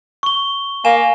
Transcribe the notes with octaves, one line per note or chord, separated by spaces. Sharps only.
C#6 G7
A#3 G#5 E7